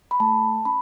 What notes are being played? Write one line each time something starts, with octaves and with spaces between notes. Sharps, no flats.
B5
A3 A5
C#4 B5